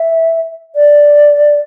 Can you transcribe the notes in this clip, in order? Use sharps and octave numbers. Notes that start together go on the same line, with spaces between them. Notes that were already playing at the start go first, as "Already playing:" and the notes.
Already playing: E5
D5